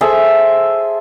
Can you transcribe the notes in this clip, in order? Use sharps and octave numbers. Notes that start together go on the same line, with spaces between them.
G#4 A4 C5 E5